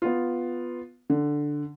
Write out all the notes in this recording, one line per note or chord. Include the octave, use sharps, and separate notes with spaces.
B3 F4
D3